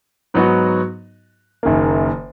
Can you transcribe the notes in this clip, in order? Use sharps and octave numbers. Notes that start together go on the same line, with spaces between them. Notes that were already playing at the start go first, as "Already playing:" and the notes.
G#2 F#3 B3 D#4 F#4
F#1 F#2 D#3 A#3